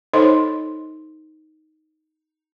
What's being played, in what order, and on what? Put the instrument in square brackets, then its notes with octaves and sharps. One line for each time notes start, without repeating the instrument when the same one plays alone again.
[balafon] D#4 A4 C5 C#5 D#5 C6